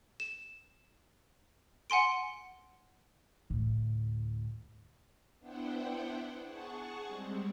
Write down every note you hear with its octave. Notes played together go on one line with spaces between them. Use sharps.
E7
F#5 G#5 C6 D7
D2 A2
B3 D4 E4 C5 F#5 G5
G#4 F#5 A5 C#6
G3 G#3 C4